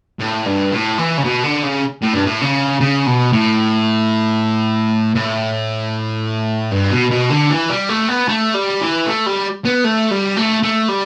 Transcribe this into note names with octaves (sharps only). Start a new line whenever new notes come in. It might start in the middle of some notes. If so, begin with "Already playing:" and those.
A2
G2
A2
E3
C#3
B2
D3
C#3
A2
G2
A2
C#3
C#3
B2
A2
A2
G2
B2
B2
D3
E3
G3
A3
B3
A3
G3
E3
A3
G3
B3
A3
G3
A3
A3
G3